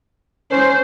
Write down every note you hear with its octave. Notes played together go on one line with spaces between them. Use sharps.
C#4 C5